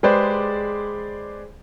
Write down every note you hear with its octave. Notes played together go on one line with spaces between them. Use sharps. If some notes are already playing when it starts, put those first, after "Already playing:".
G#3 G4 G#4 B4 C5 D5